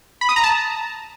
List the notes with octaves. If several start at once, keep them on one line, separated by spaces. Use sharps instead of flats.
B5
D#6
A#5
A5